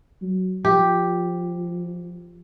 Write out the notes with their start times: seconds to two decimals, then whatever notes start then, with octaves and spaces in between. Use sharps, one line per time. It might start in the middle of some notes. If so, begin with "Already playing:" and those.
0.22 F#3
0.65 F3 G4